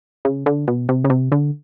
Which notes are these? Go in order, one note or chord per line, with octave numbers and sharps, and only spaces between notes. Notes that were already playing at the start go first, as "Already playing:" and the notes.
C#3
D3
B2
C3
C#3
C3
D3